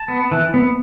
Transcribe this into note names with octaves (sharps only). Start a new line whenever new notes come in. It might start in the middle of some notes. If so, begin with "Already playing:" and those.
Already playing: A5
B3
E3
B3